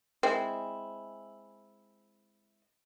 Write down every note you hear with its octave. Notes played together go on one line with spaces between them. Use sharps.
G#3 C4 E4